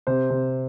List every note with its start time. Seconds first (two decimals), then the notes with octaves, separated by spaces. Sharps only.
0.07 C3 C5
0.30 C3